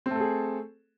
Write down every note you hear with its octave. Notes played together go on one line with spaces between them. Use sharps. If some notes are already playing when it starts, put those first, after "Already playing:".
A3 C4 G#4 A4